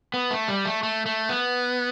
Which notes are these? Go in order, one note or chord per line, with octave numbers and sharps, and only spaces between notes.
B3
A3
G3
A3
A3
A3
B3